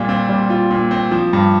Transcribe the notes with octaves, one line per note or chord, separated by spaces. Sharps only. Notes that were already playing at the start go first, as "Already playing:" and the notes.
Already playing: A#2 G3 F4
C4
G3
F4
A#2
C4
F3
G2